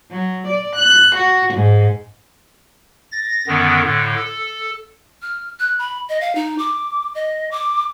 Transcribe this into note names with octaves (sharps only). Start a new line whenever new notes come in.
F#3
D5
F#6
F#4
G#2
A6 A#6
F#2 D3 D#3 B3
A2 D3
A4
F6
F#6
B5
D#5
F5
D#4
D6
D#5
D6